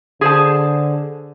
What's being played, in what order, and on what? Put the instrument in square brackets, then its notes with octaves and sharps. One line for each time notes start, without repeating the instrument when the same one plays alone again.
[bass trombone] D3 [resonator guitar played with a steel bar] G#4 C5 A5